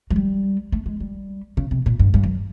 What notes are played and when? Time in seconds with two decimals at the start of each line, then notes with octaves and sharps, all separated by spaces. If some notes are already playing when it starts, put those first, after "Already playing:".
0.10 F#3
0.16 G3
0.72 A3
0.86 G#3
1.00 G3
1.57 C#3
1.71 C3
1.86 A#2
1.99 G2
2.14 G2
2.24 F#2